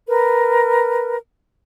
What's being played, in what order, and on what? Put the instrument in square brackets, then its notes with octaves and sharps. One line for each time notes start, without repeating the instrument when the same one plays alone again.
[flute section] A#4 B4